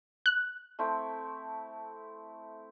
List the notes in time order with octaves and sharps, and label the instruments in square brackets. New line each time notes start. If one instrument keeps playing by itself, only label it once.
[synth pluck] F#6
[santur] A3 C4 E4